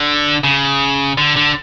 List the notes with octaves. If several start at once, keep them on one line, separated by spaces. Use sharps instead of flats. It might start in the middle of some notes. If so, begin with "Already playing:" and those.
Already playing: D3
C#3
D3
D3